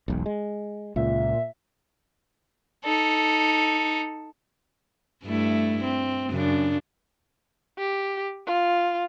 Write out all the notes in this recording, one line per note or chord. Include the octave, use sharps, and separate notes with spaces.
E1 B1
G#3
C#2 A#2 E5
D#4 A4
G2 A3 E4
C4
F#2 C#3 D4
G4
F4